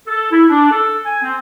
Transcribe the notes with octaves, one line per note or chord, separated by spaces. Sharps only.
A4
E4
D4
A4
G#5
C4